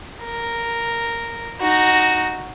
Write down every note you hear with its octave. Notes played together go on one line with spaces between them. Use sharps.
A#4
D#4 F#4